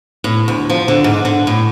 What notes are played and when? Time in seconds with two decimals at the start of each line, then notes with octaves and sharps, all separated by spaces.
0.24 A2
0.48 D2
0.70 F3
0.88 D3
1.04 G#2
1.25 D3
1.47 A2